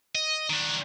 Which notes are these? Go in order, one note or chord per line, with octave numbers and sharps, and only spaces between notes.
D#5
D#3 D4